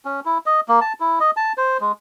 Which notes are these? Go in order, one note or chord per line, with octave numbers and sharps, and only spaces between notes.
C#4
E4
D#5
A#3
A5
E4
D#5
A5
C5
G#3